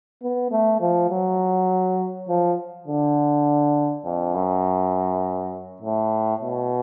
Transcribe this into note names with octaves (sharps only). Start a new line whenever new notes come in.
B3
A3
F3
F#3
F3
D3
F2
F#2
A2
B2